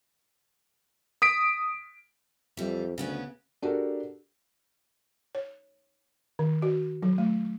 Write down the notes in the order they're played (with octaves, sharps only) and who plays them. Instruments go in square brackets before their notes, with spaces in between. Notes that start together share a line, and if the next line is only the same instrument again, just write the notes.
[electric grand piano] D#6 B6 D7
[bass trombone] F2 [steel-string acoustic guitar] E3 G3
[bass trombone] D2 [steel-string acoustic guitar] C#3 B3 C#4
[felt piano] D4 F#4 G4 A4 A#4
[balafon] C#5
D#3
F#4
F#3
A3